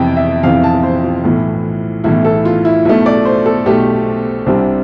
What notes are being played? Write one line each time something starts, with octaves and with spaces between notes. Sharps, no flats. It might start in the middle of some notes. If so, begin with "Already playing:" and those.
Already playing: F2 C3 E3 G5
E5
F2 C3 E3 F5
A5
C5
F4
B1 A2 E3
B1 A2 E3 E4
A4
F4
E4
B1 B2 A3 E4
D5
C5
A4
B1 B2 A3 G4
C2 C3 G3 C4 D4